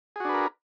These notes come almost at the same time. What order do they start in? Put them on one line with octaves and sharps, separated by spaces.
G#4 F#4 D4 B4 A#4